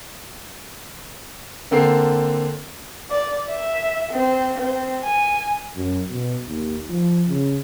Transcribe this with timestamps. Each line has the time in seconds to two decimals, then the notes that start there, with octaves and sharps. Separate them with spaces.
1.71 D3 A#3 C4 A4 C7
3.10 D5
3.49 E5
4.11 C4
4.58 C4
5.03 G#5
5.76 F#2
6.10 B2
6.47 D#2
6.89 F3
7.28 C#3